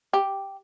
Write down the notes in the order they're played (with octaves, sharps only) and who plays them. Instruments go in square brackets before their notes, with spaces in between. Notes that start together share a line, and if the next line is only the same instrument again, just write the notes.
[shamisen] G4